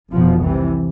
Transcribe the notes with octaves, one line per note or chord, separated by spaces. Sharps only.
F1 E2 B2 F3
C2 C3 E3